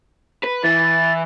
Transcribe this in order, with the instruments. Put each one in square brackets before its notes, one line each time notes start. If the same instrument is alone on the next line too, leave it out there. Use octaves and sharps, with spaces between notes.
[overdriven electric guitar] B4
[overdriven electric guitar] E3 [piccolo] A6